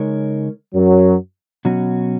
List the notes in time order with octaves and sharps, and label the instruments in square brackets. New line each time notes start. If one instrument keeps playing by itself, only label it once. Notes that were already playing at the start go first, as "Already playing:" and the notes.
Already playing: [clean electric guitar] C#3 G#3 D#4 A#4 C#5
[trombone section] F#2 F#3
[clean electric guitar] B2 F#3 C#4 F#4